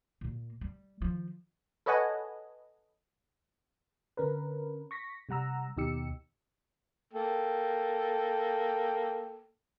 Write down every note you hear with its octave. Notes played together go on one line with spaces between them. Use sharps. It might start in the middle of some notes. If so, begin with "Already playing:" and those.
A#2 A#3
G3
D#3 F3
A4 B4 C#5 D#5 F#5 G#5
D3 C#4 A#4 B4
C#6 A#6 B6
C3 G3 F#5 A#5 E6
D#2 B2 D#4 G4 E6 C#7
A#3 A4 G5